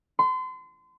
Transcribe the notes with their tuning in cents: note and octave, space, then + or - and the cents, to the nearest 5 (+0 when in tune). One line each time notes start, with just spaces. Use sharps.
C6 -35